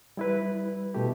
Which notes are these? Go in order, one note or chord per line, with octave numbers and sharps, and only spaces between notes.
G3 E4 B4
B2 A3 G4